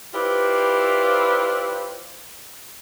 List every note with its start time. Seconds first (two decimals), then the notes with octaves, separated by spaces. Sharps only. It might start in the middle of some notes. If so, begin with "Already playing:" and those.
0.14 E4 F4 G4 B4 C5 D5